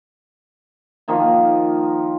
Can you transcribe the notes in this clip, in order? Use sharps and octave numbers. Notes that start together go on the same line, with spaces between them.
D#3 F3 A#3